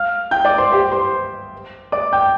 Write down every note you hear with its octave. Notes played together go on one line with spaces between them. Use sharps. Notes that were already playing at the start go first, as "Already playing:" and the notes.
Already playing: F5 F6
G5 G6
D5 D6
C5 C6
G4 G5
C5 C6
D5 D6
G5 G6